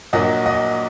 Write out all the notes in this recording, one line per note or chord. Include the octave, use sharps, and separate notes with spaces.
A#1 A#2 F#3 D#5 F#5
D#5 F#5